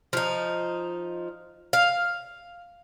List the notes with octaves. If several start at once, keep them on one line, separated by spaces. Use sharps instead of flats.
F3 D#4
F5